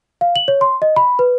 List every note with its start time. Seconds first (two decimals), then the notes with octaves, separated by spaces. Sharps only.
0.21 F5
0.36 F#7
0.48 C#5
0.61 C6
0.82 D#5
0.96 B5
1.19 B4